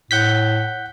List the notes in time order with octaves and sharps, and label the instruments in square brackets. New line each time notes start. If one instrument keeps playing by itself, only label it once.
[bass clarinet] A2 [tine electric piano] F#5 G6 B6